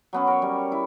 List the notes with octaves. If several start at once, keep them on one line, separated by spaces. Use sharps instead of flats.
F#3 B3 C#4
A#4 C#5
G3
E4